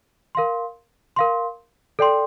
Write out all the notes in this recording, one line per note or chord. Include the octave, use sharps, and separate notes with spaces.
A#4 F5 C6
A#4 F5 C6
A4 D5 G5 C6